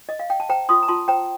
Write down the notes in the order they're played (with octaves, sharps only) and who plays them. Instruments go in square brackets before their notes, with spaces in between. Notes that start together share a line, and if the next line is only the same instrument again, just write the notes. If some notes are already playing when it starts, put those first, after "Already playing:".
[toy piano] D#5
F5
G5
A5
C5 G5 A#5
F4 C6 D#6
A#5
F4 A5 C6
C5 G5 A#5